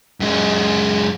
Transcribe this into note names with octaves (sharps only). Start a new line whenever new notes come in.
F#2 G#3